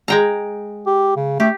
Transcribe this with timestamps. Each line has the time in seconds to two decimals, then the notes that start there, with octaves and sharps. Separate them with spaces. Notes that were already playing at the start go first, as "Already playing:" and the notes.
0.08 G#3 G5 A#5
0.87 G4
1.16 C#3
1.40 A3 G4